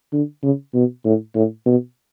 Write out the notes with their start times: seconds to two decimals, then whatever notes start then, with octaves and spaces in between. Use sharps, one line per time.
0.13 D3
0.43 C#3
0.74 B2
1.05 A2
1.35 A2
1.66 B2